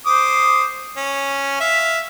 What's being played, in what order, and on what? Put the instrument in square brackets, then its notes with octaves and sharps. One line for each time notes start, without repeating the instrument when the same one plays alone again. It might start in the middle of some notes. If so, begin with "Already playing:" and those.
[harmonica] C5 D6 D#6
C#4
E5 F5